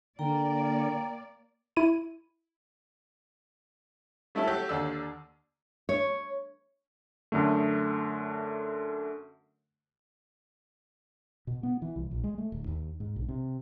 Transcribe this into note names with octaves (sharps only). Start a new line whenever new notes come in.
D3 A#3 D5 G5 A#5
E4 D#7
G3 A3 C#4 E4 A4
F#3 G4 A4
D#2 D3 D5 E6
C#5
F#2 D3 A3
B2
B3
E3
C2
A#1
G#3
A3
D1
D#2
G#2
B1
C3